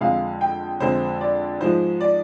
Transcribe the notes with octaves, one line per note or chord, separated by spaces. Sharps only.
F2 D3 G#3 F5
G5
F2 D3 G#3 C5
D5
G#2 F3 G#3 C5
D5